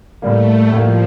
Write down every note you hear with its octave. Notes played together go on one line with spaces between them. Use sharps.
A2 G3 A3 A#3
A2 F3 G3 A#3